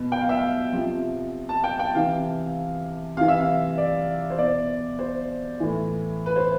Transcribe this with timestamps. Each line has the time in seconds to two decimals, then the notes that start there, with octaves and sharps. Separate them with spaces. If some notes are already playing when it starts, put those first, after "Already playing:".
Already playing: B2
0.12 G5
0.21 F5
0.29 E5
0.37 F5
0.73 C3 F3
1.49 A5
1.64 G5
1.79 G5
1.94 C3 E3 F5
3.17 C3 E3 F5
3.28 E5
3.41 F5
3.78 D5
4.30 C5
4.38 B2 D5
4.99 C5
5.60 A2 E3
6.26 B4
6.36 C5